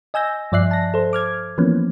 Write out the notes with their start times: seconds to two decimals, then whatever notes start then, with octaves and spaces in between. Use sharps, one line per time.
0.14 D#5 G#5 E6 G6 A#6
0.52 G2 F3 D5 E5 F#6 C7
0.71 A5 A#6
0.94 A4 C5
1.13 D6 F6 G#6
1.58 E3 F3 A#3 B3 C#4